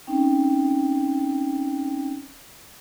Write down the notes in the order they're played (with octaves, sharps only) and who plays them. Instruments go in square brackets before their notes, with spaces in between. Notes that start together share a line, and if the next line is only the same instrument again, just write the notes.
[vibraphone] C4 C#4 D#4 G5